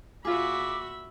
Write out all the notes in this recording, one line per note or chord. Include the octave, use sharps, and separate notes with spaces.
A#2 F4 F#4 G#4 E5 B5 D6